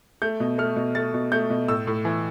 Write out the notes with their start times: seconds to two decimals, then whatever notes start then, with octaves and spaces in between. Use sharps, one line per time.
0.22 A3 G6
0.40 B2
0.58 A3 F6
0.76 B2
0.95 A3 A6
1.14 B2
1.32 A3 G6
1.50 B2
1.68 A2 E6
1.87 A2
2.05 E3